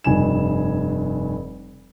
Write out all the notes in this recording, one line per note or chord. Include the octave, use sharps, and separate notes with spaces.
F1 G2 G#5 E7